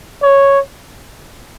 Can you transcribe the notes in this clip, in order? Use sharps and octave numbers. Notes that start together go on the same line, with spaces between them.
C#5